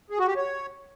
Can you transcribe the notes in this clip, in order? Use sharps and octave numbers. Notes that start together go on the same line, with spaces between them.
G#4
F#4
G4
C#5